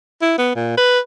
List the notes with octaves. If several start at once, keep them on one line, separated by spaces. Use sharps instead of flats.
E4
B3
A#2
B4